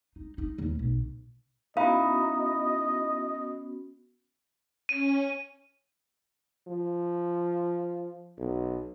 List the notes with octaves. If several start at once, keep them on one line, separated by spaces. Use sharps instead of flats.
D#4
D#4
D#2
B1
B3 C#4 D#4 E4 F#4 D#5 F5
C#4 D#7
F3
B1